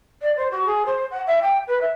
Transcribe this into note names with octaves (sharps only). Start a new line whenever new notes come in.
D5
C5
F#4
G#4
C5
F#5
E5
G5
B4
E5